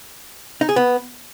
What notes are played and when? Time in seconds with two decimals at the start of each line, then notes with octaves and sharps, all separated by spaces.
0.61 D#4
0.69 G#4
0.76 B3